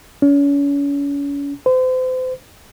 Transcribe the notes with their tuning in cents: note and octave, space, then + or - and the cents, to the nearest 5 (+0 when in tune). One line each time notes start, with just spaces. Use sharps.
C#4 +35
C5 -35